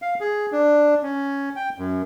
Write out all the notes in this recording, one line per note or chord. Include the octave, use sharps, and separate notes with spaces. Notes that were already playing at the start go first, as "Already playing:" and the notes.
F5
G#4
D4
C#4
G5
F#2